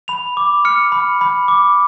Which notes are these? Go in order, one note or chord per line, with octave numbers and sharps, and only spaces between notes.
B5 F7
D6
F6 C#7
B5
B5
D6